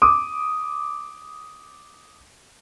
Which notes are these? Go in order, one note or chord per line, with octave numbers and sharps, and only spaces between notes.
D6 D#6